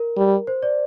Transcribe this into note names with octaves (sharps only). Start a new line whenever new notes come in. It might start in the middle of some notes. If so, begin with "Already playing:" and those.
Already playing: A#4
G3
C5
D5